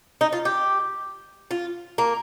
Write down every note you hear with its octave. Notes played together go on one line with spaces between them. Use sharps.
D#4
F4
G4
F4
A#3